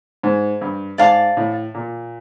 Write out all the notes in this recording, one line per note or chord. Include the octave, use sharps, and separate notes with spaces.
G#2
G2
G#2 D5 F5 A5 D6
A2
A#2